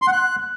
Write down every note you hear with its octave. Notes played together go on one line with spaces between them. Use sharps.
C6
F#5
F#6